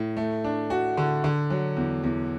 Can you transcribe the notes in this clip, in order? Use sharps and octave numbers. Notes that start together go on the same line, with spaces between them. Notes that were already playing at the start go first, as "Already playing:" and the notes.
Already playing: A2
A3
D4
F#4
D3
D3
F#3
E2
E2